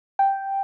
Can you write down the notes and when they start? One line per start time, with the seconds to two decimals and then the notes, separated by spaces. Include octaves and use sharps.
0.19 G5